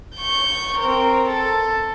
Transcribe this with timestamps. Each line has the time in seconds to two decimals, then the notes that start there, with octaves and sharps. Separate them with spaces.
0.16 C#6 G6
0.78 C4 A#4
1.29 A4